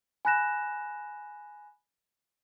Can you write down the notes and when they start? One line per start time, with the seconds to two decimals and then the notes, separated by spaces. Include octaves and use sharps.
0.25 G#5 B5 F#6 A#6 E7